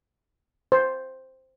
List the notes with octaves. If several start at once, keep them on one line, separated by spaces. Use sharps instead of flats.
C5